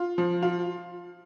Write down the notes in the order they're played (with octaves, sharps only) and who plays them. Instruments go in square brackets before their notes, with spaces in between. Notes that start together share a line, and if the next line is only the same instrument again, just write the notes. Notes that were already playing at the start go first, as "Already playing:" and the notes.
Already playing: [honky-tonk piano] F4
F3
F4